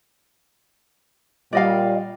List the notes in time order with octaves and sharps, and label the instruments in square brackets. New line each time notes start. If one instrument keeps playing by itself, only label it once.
[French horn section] A#2 G3 [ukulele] D5 D#5 F5